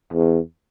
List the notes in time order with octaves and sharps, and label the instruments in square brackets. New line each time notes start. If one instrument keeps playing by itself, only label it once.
[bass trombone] E2